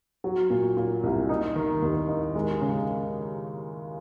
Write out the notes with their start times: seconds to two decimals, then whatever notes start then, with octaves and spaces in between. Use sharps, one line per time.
0.24 F#3
0.50 A#2
0.77 A#2
1.03 C2
1.29 D#4
1.56 D#3
1.82 D#2
2.09 D#4
2.35 G#3
2.61 C#3